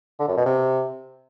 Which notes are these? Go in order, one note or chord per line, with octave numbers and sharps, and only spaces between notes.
D3
F#2
B2
C3